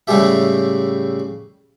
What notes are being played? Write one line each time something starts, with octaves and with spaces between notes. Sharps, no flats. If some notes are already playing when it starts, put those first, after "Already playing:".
A2 C#3 G3 G#3 G4 E5